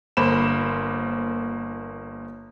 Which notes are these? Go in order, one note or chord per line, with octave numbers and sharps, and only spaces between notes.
G1 A#3 C5 B5 E7